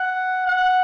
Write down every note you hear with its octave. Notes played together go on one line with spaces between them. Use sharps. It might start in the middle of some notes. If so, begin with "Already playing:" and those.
Already playing: F#5
F#5